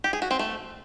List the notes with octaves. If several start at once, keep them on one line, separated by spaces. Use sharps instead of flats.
G4
G#4
F#4
C4
A3